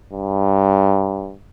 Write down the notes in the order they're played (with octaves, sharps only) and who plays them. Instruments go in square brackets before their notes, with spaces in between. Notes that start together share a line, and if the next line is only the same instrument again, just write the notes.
[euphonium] G2